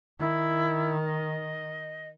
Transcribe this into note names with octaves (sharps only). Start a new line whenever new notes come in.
D#3 E4
D#5